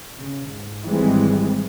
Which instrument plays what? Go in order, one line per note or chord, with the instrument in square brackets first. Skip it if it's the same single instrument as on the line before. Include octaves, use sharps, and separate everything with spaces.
[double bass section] C#3
G#2
G#1 E3 G3 G#3 C4